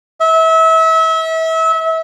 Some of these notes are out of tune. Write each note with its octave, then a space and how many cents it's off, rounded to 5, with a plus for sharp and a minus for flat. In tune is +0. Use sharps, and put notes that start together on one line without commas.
E5 -30